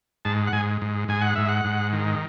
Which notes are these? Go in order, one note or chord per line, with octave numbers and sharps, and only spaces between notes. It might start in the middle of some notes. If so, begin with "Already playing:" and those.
G#2 A5
F#5
G#2 G#5
G#2
G#2 G#5
F#5
G#2 E5
F#5
G#2
D#3